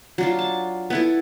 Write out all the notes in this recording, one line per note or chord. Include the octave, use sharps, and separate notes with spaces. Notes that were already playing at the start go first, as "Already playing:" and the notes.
F#3 D4 F4
A5
B3 E4 A4